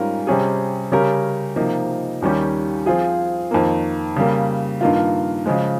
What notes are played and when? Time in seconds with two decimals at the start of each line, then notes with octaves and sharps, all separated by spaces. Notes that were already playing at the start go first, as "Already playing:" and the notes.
Already playing: G#2 G3 C#4 F4 A#4
0.27 C3 G3 C#4 G#4
0.92 C#3 G3 C#4 G4 A#4
1.56 C3 F3 A#3 D#4
2.22 D#2 D#3 G3 C#4 G4
2.86 F3 C4 F4 G#4
3.51 F2 D#3 A#3
4.16 C#3 G3 A#3
4.81 G2 D#3 A#3 F4
5.46 C#3 F3 G#3